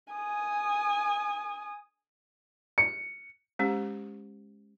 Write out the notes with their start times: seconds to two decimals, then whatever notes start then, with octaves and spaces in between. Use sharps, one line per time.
0.14 G#5 D#6
2.78 C#7
3.59 G#3 C#4 G4 C5